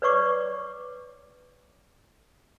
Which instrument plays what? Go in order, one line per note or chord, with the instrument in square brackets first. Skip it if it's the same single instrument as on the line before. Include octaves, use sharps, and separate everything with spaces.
[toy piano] B4 C#5 D5 C#6 D6